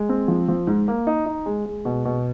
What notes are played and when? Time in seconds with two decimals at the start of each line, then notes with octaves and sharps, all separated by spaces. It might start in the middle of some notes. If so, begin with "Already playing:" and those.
Already playing: G#3
0.09 C4
0.28 F3
0.48 F3
0.67 G#2
0.88 A#3
1.07 D#4
1.26 D#4
1.46 G#3
1.65 G#3
1.85 B2
2.05 B2